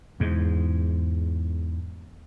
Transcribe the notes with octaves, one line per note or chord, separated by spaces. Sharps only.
E2 G#2